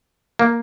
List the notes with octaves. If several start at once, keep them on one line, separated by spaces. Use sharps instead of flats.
A#3